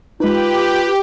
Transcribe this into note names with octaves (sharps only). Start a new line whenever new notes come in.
G#3 D#4 F4 G4 B4